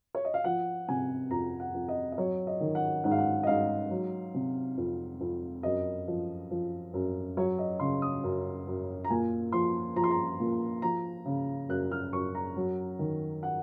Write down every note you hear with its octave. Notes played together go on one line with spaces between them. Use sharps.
C#5
D#5
F5
F3 F#5
C3 G#5
F2 A#5
F#5
F2
D#5
D#5
F#3 C#5
D#5
D#3
F#5
G#2 F#5
F5
F#5
D#5
G#2 F5
F#3
C3
F2
F2
F#2 D#5
F3
F3
F#2
F#3 C#5
D#5
C#3 C6
D#6
F#2
F#2
A#5
A#2 G#5
F3 C6
F3 A#5
C6
A#5
A#2
F3 A#5
C#3
F#2 F#6
F6
F#2 C#6
A#5
F#3
D#3
F#5